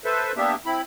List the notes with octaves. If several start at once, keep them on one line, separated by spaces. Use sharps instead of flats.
A4 B4 C5 E5
A#3 B3 D4 G4 E5
C4 E4 B5